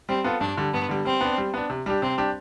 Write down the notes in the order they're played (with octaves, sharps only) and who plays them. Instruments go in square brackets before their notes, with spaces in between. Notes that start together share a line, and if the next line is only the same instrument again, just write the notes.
[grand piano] G3 [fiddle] C4
[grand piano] B3 F4 A4
[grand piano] G2 [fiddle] D4
[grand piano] D3 G3
[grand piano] G2 [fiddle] B3
[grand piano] D3 G3
[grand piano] G3 [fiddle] C4
[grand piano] B3 D4
G3
B3 D4
C3
G3 D4 G4
[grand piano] C3 [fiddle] C4
[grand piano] G3 D4 G4